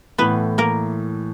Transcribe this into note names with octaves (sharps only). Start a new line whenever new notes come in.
A2 E3 A3 B3 B4
A#3 A#4